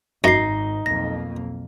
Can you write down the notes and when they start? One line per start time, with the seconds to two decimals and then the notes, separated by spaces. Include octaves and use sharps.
0.24 G#1 F#2 D#4 A#6 C7
0.86 B1 F2 A#3 A#6